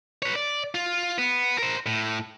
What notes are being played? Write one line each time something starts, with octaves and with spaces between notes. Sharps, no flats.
B4 C#5
D5
F4
B3
A#4 C5
A2